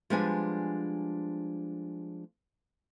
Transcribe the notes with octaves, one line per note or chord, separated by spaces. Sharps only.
F3 G3 G#3 B3 D4 G#5